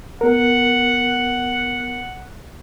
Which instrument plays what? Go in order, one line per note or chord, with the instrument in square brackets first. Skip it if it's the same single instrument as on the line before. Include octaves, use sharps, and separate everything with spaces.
[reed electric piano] B3 A#4 [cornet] F#5